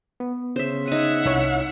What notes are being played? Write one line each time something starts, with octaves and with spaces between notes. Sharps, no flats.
B3
C#3 C5 E5
D#4 E5 F#5 G#5
C2 E4 C#5